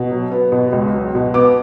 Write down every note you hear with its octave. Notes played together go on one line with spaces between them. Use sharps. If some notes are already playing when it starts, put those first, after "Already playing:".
Already playing: B2
F#3
B3
B2
C#2
F#3
B2
B3 D6